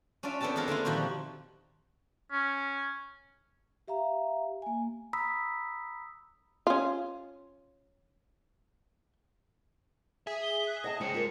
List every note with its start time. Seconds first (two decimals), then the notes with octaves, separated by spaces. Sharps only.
0.23 C#4 D4 F4 D5 E5
0.41 B3 C4 D4 A4 G5 A5
0.56 G#3 D4 A4 A#4 F5
0.68 D3 A#3 E4 F4
0.85 A#2 D#3 F3 G3 E4 F#4
2.32 C#4
3.88 G4 E5 F5 A#5
4.62 A#3 G#5
5.13 A#5 B5 D#6 E6 B6
6.67 C#4 F4
10.27 G#4 E5
10.42 G7
10.67 F#6
10.84 D#5 F#5 A5 A#6
11.01 C#3 G#3 C5 G5 G#5 C#7
11.14 F4 A#4